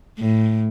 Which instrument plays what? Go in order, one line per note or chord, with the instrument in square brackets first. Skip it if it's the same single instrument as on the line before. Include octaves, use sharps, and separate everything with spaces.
[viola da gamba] A2